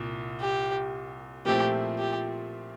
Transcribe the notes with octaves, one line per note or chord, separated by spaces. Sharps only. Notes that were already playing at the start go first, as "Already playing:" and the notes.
Already playing: C2 A#2
G4
A#2 F3 A3 C4 E4 G4
G4